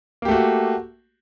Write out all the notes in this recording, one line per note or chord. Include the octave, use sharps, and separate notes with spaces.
A3 A#3 F#4 G4